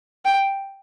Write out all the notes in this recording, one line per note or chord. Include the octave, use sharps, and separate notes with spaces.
G5